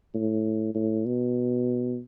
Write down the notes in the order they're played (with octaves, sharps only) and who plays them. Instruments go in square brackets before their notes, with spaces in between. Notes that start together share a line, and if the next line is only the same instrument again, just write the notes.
[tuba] A2
A2
B2